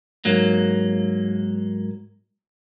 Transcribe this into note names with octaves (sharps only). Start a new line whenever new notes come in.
G#2 F#3 A#3